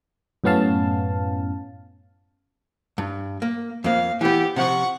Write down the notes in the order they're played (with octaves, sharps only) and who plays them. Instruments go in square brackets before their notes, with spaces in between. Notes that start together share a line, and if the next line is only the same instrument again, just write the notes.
[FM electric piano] F#2 A2 B3 C#4 F5 A5
[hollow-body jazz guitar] G2
A#3
[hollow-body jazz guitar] F2 A#3 [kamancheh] F5
[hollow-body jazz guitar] E3 B3 [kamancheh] G4
[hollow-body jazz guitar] C3 F3 [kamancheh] F#5 C#6